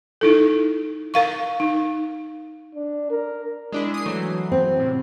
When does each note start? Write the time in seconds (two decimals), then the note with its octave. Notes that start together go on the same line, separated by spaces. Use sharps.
0.21 D#4 E4 A4
1.14 A#4 F5 C#6
1.60 D#4
2.75 D4
3.11 A#4
3.72 G#3 D4 E4
3.94 D#6 C7
4.05 E3 F#3 A3
4.52 C4
4.80 A2 C3